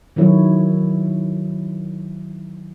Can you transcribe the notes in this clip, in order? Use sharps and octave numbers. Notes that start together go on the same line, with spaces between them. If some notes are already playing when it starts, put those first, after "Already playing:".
D#3 F#3 E4 C#5